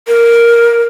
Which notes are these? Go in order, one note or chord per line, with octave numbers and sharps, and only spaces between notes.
A#4